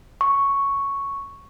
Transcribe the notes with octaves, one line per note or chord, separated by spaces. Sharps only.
C#6